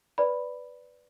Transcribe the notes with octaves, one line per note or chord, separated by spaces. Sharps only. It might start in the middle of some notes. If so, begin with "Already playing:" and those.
B4 D5 B5